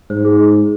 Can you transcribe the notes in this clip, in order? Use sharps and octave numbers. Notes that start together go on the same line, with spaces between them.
G#2 C5
G#4